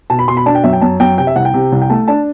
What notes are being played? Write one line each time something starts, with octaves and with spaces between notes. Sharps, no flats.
B2 A5
B5
B2 C6
B5
D4 A5
G5
F#2 E5
G5
F#2 A5
F#2 G5
C3 G5
E5
C2 F#5
G5
C3
C2
G5
A3 A5
D4 A5